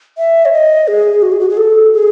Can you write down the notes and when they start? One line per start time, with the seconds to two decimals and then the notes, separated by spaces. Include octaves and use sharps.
0.18 E5
0.45 C#5
0.53 D#5
0.88 G#4
1.22 F#4
1.32 G#4
1.40 F#4
1.50 G#4
1.57 A4
1.93 G#4